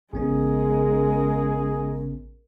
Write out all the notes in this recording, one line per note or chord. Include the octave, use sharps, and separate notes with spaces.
A1 C#3 G#3 B3 C#4 G#4 A#4